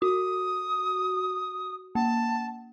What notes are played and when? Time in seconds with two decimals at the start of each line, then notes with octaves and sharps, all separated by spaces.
0.02 F#4 D#6
1.95 A#3 A5